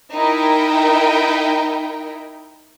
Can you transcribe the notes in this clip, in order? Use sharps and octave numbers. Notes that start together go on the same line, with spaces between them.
D#4 E4 A#4 G5